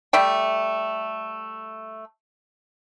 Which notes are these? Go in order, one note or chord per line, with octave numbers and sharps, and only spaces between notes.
G3 A3 E5 G5